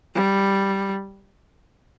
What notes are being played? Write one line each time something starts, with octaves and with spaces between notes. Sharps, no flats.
G3